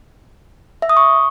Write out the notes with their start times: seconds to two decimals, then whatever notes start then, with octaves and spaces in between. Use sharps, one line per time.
0.82 E5
0.89 D#6
0.97 C#6